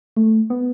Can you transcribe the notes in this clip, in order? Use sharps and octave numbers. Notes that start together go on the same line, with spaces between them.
A3
B3